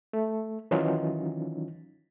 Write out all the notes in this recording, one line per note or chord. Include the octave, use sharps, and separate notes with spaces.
A3
D#3 E3 F#3 C#4 D#4 F4